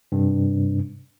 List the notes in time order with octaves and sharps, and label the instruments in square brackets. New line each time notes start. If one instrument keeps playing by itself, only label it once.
[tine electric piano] G2 C3 G3